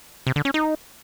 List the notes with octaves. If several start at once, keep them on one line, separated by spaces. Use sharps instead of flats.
C3
D3
C#4
D#4